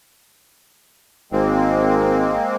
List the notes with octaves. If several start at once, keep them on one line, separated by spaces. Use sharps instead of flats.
G#1 G#3 A#3 C4